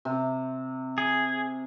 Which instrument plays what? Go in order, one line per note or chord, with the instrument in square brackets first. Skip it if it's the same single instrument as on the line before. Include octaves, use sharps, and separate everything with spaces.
[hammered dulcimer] C3
[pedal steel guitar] G#4